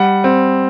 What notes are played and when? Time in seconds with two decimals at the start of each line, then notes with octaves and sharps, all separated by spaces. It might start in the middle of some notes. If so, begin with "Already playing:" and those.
Already playing: G3 F#5
0.24 C4